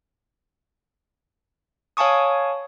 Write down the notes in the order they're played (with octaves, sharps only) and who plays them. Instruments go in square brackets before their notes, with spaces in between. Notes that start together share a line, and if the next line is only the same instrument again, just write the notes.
[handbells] C#5 F5 G#5 A5 C#6 D#6